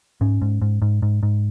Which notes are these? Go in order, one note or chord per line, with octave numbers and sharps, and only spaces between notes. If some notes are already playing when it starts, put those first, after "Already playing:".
G#2 C#4
G#2
G#2
G#2
G#2
G#2